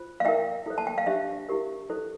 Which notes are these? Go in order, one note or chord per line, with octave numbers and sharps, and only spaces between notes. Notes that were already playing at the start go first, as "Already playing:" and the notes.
Already playing: F4 C5
F5
E4 A#4 E5 G5
E4 A4 C5
A5
G5
F5
D4 G4 C5 E5
E4 G4 A#4
E4 A4 C5